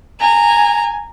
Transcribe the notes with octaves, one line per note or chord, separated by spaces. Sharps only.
G#5 A#5